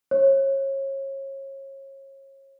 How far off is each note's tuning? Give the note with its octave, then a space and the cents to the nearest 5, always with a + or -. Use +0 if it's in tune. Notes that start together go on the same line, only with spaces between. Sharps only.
C#5 -30